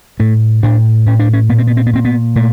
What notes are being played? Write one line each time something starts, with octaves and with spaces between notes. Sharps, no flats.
A2 A3
A2 D4
A2 C#4
D4
C#4
A#2 B3
C4
B3
C4
B3
A#2 C4
B3
A#2 A3